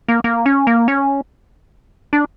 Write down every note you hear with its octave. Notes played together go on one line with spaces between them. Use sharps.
A#3
A#3
C#4
A#3
C#4
D4